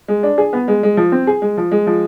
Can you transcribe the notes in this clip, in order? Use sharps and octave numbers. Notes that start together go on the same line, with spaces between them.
G#3
D4
G#4
B3
G#3
G#3
F3
C4
G#4
G#3
F3
G#3
F3